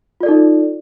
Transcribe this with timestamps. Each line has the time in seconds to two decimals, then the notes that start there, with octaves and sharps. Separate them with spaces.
0.21 F4
0.23 D5
0.26 A4
0.28 D#4